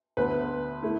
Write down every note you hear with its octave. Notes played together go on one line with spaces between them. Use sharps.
D2 D3 B3 B4
A3 E4